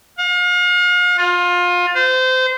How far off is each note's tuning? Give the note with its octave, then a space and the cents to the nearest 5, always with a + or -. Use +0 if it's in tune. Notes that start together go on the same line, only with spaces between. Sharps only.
F5 +40
F4 +25
C5 -25